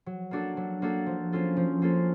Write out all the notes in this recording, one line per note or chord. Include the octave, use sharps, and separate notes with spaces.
F#3
A#3 D4 F#4 A4
F#3
A#3 D4 F#4 A4
F3
A#3 C#4 F4 A4
F3
A#3 C#4 F4 A4